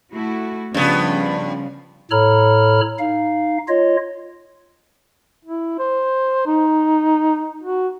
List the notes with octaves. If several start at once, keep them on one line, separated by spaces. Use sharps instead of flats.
A3 E4 F#4
G2 C#3 F3 G3 B3
A2 A4 C#5 A#5 B5 F6
D#4 F5
F4 C#5 D#5
E4
C5
D#4
F#4